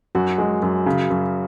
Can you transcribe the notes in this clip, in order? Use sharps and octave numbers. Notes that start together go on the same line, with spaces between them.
F#2 F#4
G#3
F#2
C#3
F#2